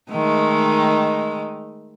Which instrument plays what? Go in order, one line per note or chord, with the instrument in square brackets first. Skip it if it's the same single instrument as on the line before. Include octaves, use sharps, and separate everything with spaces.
[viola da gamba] D#3 G#3 A3